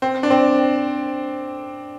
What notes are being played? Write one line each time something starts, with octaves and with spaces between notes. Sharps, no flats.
C4
D4
C4